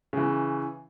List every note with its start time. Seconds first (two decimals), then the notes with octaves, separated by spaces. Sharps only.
0.13 C#3 E3